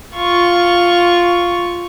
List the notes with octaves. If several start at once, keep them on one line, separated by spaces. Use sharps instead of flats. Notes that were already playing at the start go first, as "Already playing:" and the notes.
F4 C#6